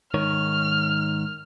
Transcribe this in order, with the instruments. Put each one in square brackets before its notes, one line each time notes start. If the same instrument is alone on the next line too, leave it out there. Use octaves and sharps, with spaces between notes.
[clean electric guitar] G#2 D#3 C#5 [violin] F6